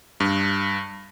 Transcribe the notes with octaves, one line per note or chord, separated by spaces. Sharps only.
G2